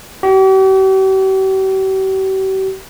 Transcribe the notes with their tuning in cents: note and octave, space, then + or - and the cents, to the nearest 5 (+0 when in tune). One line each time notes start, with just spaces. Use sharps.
G4 -45